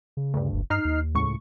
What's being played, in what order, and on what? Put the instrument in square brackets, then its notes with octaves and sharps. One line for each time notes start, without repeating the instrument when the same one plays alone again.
[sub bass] C#3
[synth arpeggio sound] D2 G2
[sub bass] F#1
[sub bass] G2 [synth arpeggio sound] D#4 F6 C7
[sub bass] D#2
[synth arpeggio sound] C#2 A2 C#6